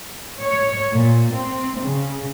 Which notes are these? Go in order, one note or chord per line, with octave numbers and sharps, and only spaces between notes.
C#5
A#2
C4
C#3